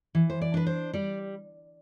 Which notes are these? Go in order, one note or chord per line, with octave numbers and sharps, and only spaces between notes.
E3
C5
D5
D4 B4
C5
G3 D5